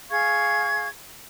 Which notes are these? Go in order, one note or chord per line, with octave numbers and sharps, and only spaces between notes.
G#4 F5 C#6 G#6